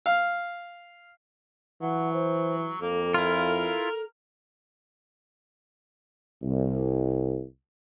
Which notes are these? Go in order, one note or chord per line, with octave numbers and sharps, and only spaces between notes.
F5
E3 F#3 F#5
C5
F2 A#3 A4
E4 F4 A#4
C2